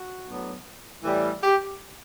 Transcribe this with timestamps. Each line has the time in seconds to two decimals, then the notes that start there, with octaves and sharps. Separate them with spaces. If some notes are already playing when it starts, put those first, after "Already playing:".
Already playing: F#4
0.25 A2 F#3 B3 D4
1.04 A2 E3 G3
1.43 G4